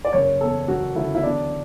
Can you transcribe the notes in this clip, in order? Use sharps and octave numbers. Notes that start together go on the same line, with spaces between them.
D5
F#1 C#5
E2 A4
F#3 F#4
D3 E4
E4
E2 D4